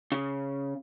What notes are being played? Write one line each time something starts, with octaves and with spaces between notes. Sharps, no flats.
C#3